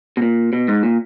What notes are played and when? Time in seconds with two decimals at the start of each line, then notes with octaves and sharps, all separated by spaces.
0.17 B2
0.22 A#2
0.53 B2
0.68 G#2
0.83 A#2